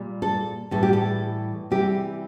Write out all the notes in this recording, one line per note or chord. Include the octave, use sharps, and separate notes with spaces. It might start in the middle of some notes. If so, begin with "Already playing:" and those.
Already playing: A#2 G3
A4
A2 E3 G3 A4
G4
A4
C3 E3 G3 G4